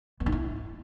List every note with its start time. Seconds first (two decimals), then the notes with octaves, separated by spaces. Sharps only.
0.20 B3
0.26 D#4
0.32 E4